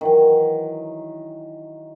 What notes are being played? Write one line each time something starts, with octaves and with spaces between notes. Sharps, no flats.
D#3 E3 F#3